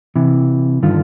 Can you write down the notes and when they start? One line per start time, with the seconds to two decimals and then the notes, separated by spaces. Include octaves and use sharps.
0.16 C3 E3
0.83 G2 D3 D#3 F4